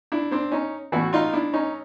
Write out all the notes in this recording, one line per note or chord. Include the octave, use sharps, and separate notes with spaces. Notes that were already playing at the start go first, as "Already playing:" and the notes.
D4 E4
C4 D4
C#4 D#4
A2 E3 E4 F#4
D#4 F4
D4 E4
C#4 D#4